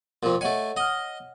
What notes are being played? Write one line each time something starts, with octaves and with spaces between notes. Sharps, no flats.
F2 A#2
A3 C#5 D#5 F#5 G#5
D#5 F#5 F6